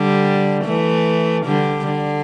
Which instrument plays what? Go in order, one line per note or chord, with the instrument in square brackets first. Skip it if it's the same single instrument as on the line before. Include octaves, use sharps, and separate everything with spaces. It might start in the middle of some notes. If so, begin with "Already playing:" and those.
Already playing: [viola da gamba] D3 G3
E3 A3
D3 G3
D3